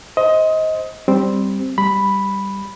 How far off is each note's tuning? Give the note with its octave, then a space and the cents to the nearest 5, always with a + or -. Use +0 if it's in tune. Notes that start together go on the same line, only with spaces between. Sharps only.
C5 +0 D#5 +20
G3 +0 C4 +0
G3 +0 B5 +0